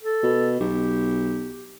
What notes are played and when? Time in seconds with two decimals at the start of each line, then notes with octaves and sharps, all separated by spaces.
0.03 A4
0.23 B2
0.60 B1 G4